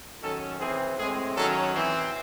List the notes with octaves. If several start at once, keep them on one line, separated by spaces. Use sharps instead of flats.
D#3 F#3 C#4 A4
E3 C4 G#4
A2 G#3 C4 G#4
D#3 F#3 C#4 A4
E3 C4